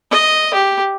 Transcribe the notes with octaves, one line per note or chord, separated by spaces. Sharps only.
D#5
G4